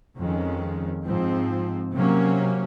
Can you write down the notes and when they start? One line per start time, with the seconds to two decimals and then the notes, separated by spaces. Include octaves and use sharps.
0.17 F2 D#3 G#3 C#4
1.05 G#2 F3 C4
1.94 C3 F#3 A#3 C#4